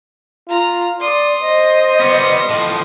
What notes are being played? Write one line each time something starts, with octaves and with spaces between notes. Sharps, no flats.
F4 A#5
D5 C6 D#6
C5 D#5
G3 B3
A2 F3